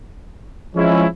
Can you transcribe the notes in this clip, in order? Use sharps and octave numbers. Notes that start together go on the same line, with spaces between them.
F3 G#3 C#4 E4